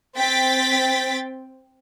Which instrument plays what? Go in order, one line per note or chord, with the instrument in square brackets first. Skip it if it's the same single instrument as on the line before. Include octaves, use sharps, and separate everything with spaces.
[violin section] C4 G5 A6 B6